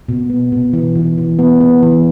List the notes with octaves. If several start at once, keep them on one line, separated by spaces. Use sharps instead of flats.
B2
B3
B2
E3
E3
E3
B3
B3
E3